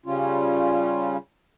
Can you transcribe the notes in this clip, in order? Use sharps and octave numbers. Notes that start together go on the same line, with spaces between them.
C#3 G3 C#4 F4